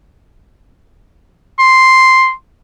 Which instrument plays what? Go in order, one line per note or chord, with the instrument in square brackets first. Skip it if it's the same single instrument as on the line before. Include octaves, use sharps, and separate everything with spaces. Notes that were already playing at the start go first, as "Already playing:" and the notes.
[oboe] C6